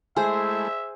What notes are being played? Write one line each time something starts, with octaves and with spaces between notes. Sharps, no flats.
G#3 A3 E4 G#4 C5 E5 G#5